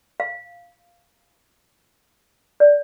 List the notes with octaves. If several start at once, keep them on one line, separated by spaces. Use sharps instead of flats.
F5
D5